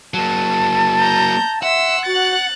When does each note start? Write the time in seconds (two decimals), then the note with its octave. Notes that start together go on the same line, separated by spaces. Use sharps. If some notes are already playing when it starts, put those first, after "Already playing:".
0.14 F#3 A#3 A5
0.99 A#5 G6
1.63 E5 F#5 C6 E6
2.06 F#4 F#6 A6